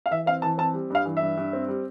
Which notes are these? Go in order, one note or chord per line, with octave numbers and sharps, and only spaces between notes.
F5
E3 E5
C4 F5
E3 A5
C4 A5
G3
G2 F5
E3
G2 E5
G2
C4
G3